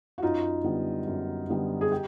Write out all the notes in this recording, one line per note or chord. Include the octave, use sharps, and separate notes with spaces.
F#4
F#2 D#4 F4
D3 G3 B3
F#2
D3 G3 B3
G#4
G4